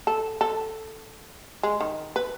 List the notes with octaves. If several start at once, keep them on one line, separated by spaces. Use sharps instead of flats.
A4
A4
G#3
D#3
B4